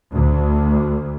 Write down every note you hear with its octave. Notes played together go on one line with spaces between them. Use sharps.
D2